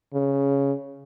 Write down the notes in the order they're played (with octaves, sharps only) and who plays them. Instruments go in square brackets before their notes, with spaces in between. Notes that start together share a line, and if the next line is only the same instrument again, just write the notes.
[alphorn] C#3